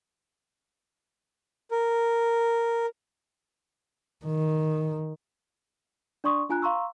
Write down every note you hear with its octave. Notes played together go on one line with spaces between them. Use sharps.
A#4
D#3
D4 D5 C6 C#6 D#6
D4 F4 G#5 A#5 F#6
F5 A#5 C6 C#6 E6